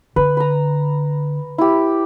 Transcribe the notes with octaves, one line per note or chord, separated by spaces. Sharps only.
D3 B4
A#5 B5
E4 G4